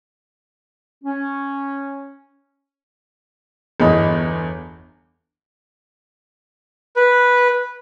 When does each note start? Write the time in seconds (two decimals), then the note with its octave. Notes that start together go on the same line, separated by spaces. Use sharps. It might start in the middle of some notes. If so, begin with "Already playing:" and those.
1.04 C#4
3.80 G1 E2 D#5 B5
6.96 B4